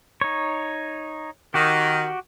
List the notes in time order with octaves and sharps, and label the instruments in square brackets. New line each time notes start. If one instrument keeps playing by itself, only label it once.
[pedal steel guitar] D#4 C#5
[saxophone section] D#3 [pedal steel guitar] F#4 G4